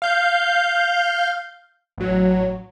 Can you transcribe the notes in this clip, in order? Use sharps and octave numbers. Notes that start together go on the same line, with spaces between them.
F5 G6
A1 F#3